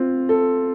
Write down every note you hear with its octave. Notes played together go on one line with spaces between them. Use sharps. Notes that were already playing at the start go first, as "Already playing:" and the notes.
Already playing: C4 F4
A4